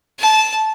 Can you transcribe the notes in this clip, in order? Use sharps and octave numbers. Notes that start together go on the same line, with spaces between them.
A5